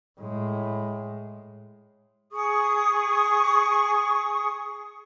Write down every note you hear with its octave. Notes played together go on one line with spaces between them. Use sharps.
A2 G#3
G#4 C#6 D#6